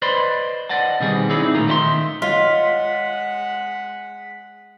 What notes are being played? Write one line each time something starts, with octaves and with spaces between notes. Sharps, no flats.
B4 C5 D5 D#5 B5 C6
D5 D#5 F#5 A5
B2 D#3 G3 B3 C4 G#4
C4 C#4 D#4 E4 G#4 D5
A#2 D#3 A3 F4 A#4
D#3 D#4 C5 E5 C6
G#3 F4 C#5 D#5 F5 F#5 B6